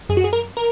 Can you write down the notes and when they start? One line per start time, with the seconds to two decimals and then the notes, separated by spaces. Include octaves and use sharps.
0.09 F#2 G#4
0.17 F#4
0.24 G#4
0.33 A#4
0.57 A#4